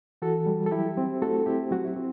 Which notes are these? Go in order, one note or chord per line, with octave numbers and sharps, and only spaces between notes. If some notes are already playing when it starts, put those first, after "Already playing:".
E3 F#4 A4
G3
A4
F#3 E4 G4
C4
A3 F#4 A4
C4 E4 G4
F#3 F#4
E4
C4